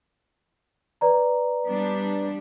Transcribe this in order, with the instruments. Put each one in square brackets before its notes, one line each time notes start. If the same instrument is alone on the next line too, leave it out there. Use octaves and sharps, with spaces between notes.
[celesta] B4 D5 A#5
[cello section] G3 B3 D4